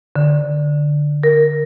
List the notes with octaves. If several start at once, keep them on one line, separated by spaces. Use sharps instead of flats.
D3
A#4